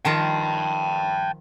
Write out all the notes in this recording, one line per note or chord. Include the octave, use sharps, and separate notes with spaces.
D#3 F3 F4 G5 A5